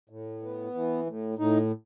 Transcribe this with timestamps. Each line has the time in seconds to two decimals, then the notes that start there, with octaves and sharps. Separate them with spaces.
0.09 A2
0.42 B3
0.75 E3
1.07 A2
1.38 A2 D#4